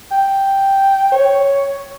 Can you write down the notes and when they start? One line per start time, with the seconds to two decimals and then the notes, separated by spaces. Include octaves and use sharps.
0.11 G5
1.12 C#5